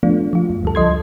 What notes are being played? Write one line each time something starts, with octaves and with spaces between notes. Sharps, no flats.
F3 A3 B3 D4 F4
F3 F4
F#2
D2 G3 A4
C#2 F3 D#5 C6 G#6